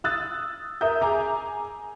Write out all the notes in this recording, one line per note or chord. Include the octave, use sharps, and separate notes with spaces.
D#6 E6 F#6 A6
A#4 E5 A#5 D#6 G6
G#4 G#5 A#5 D6